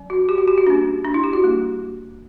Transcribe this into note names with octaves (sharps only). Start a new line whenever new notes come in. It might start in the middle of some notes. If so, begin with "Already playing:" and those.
Already playing: F#3 C#4
F#4
G4
F#4
G4
F#4
G3 A#3 C#4 D4
D4
E4
G4
F#4
G3 A#3 D4